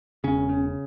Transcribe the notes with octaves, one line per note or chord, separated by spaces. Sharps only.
E1 C#3 C#4
C#3